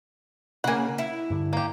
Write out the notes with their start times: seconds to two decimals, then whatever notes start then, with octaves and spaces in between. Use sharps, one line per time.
0.64 C#3 A#3 F#5 G#5
0.98 E4
1.30 G2 D3
1.53 A#3 G4